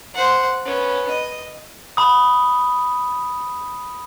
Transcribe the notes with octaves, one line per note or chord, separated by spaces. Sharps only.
C5 F#5
B3 C#4
D#5
B5 D#6